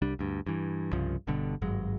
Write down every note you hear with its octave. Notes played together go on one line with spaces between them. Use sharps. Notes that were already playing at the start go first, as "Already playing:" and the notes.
C2 G3 D4
D2 G2
G2 E3
C2 G2 C#3 F3
G1 G2 B2 D3
G#1 G2 F#3 G#3